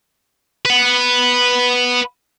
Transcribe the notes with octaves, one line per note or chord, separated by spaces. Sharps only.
B4 F#5